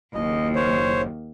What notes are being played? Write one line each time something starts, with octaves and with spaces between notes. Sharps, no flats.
F#1 D#2 D#5
C5 C#5